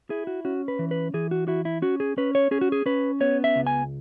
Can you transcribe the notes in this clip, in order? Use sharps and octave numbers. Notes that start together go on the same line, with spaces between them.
E4 G#4
F#4
C#4 F#4
B4
E3
B4
E3 G#4
F#4
E4 F#4
E4
C#4 F#4
G#4
C#4 B4
C#5
C#4 G#4
F#4
G#4
C#4 B4
B3 C#5
E5
C#2
G#5